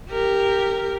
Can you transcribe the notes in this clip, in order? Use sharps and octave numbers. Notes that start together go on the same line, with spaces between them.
G4 A#4